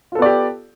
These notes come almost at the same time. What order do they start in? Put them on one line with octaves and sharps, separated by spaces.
F4 A4 B3 D5 G4